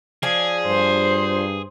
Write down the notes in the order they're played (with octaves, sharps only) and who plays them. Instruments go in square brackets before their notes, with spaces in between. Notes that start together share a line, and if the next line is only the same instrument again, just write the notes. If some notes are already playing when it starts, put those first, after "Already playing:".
[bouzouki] F3 D5 G#5 [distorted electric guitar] G#4
[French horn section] G2 [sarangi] C5